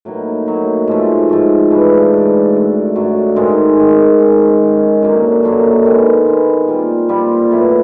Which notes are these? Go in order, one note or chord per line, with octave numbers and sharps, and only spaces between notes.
A2 F#3 A#3 D#4
A2 F#3 A#3 D#4
G#2 F3 A3
G#2 F3 A3
G#2 E3 A3 D4
G#2 E3 A3 D4
F#2 D3 F#3 A3
F#2 D3 F#3 A3
G#2 D#3 G#3
G#2 D#3 G#3
D#3 G#3 C#4
D#3 G#3 C#4
F#2 D3 F#3 A#3
F#2 D3 F#3 A#3
D#3 G#3 B3
D#3 G#3 B3
A#2 G3 C4 F4
A#2 G3 C4 F4
A2 F#3 B3 E4